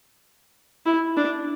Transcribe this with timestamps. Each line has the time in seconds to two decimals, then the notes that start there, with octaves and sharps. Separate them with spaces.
0.86 E4
1.17 D4